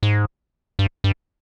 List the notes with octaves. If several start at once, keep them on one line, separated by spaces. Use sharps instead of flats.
G#2
G2
G2